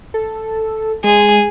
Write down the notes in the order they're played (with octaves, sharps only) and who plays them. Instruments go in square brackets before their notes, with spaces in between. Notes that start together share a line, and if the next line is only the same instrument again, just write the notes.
[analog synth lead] A4
[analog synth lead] G#3 [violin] G#4